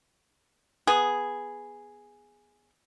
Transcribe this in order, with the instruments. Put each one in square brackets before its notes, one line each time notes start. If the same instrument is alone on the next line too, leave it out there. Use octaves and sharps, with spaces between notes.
[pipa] B3 G#4